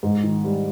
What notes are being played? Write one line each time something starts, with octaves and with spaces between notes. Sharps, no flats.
G#2
D#3
G3